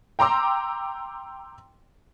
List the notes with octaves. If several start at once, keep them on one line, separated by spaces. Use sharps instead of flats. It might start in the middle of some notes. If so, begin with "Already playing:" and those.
G5 A#5 C6 D6 E6